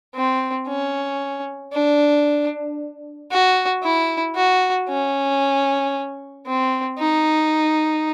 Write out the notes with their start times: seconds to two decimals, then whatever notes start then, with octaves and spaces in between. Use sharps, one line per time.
0.16 C4
0.68 C#4
1.73 D4
3.31 F#4
3.83 E4
4.35 F#4
4.89 C#4
6.46 C4
6.98 D#4